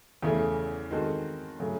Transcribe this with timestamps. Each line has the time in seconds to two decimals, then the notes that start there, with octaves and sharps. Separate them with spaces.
0.23 E2 C#3 E3 A3
0.91 D#3 G#3 C4 F#4 A4
1.59 C#3 F#3 A3